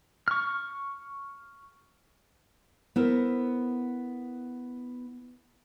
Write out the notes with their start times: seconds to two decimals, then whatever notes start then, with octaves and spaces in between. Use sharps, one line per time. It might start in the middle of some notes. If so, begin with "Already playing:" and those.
0.28 C#6 F6
2.96 B3 E4 A#4 C5